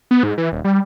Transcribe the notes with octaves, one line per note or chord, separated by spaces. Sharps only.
B3
G#2
E3
D#1
G3